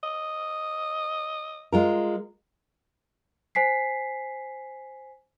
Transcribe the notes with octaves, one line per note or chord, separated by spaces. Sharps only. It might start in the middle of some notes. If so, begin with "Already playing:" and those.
D#5
G#3 F4 A#4
C5 G#5 B6 C7